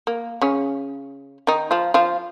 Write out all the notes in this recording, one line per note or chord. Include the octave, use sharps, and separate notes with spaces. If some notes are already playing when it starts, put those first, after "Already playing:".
A#3
C#3 C#4
D#3 D#4
F3 F4
F3 F4